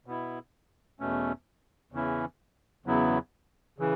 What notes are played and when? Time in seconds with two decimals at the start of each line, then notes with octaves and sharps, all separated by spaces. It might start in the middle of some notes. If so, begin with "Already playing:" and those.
0.06 B2 B3 E4
1.00 E2 B2 A3 C#4
1.92 E2 C#3 E3 C#4 E4
2.86 E2 C#3 F#3 B3 E4
3.78 C#3 E3